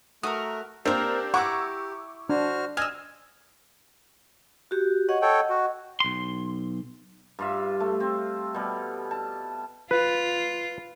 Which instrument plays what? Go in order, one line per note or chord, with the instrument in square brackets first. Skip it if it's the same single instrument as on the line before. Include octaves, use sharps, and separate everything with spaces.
[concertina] A3 [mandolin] F#4 A#4 [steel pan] D#6
[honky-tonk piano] A#3 D4 C5 [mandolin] C4 A#4 [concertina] G4
[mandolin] E4 A#5 [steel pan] F#5 [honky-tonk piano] C#6 D6 E6
[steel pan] D4 [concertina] F#4 C5 F6
[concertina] D#5 [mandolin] G#5 E6 [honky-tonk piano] F6
[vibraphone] F#4 G4
[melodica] C#5 [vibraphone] D#5 F#5
[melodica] A4 C#5 G5
F#4
[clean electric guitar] B1 C6
[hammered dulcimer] G2 F4 E5
A3
C4
B2 G3
A5
[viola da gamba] F4 [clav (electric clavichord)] B4